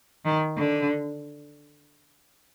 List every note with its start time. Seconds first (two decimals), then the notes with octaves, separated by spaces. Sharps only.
0.25 D#3
0.57 D3